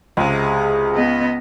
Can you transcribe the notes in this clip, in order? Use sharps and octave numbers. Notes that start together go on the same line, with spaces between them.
C#2 C3 G#3
B3 D#5